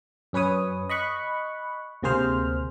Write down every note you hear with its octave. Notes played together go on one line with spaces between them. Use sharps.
F#2 C#4 B4 C#5 D#6
D#5 B5 C#6 F#6
D2 C3 A#3 G#4 C5 F6